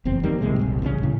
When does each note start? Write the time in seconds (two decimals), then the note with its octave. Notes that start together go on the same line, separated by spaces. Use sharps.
0.05 F#1 E2 C4
0.23 D#3 G3 A#3
0.41 C#2 A2 C3 G#3
0.59 D#1 C2
0.82 A1 C#3 B3 C#4
1.03 A2 C#3